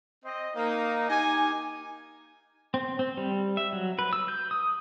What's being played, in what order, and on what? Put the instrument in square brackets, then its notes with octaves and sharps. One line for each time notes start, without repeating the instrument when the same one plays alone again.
[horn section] C4 C5 D#5
A#3 D#4
D#4 G4 G#5
[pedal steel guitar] C4
C4
G3
E5
F#3
B4
E6
G6
D#6